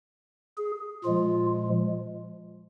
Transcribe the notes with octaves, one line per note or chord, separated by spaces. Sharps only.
G#4
A#2 F3 G#3 F4